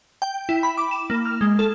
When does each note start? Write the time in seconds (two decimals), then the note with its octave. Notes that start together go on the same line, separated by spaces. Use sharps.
0.22 G5
0.49 E4
0.63 B5
0.78 D6
0.91 E7
1.10 A#3
1.26 F6
1.41 G#3
1.59 A4